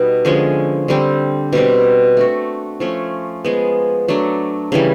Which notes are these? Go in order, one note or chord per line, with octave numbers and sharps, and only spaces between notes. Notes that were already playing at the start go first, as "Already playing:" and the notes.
Already playing: B2 G3 B3 D#4
D3 F3 G#3 C#4
D3 G3 C4
B2 G3 C4
A3 D4 F#4
F3 A3 C#4
F3 G#3 B3
F#3 A3 D4
C#3 E3 G3